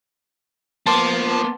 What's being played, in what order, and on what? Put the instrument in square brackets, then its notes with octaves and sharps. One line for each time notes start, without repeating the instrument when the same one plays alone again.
[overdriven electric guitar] F3 [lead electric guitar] A#3 B3 [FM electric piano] A5 C6 D6